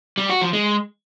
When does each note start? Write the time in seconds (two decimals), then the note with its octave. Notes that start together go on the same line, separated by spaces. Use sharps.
0.18 G3
0.29 F#4
0.41 F3
0.53 G#3